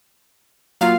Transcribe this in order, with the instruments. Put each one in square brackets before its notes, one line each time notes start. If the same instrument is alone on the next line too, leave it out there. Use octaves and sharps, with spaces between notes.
[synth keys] F#3 A#3 F4 [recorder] F5